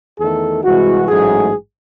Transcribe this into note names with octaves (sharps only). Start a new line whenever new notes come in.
E2 D#3 A3 A4
C2 C3 E3 G#3 F#4
A1 G#2 F#3 A3 G#4